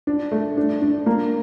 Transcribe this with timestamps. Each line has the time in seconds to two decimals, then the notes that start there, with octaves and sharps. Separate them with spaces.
0.07 D4
0.31 A3
0.57 D4
0.82 D4
1.06 A#3